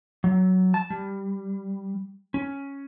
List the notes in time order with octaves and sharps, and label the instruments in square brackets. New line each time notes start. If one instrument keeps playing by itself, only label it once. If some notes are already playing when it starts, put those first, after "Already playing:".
[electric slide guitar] F#3
A5
G3
C#4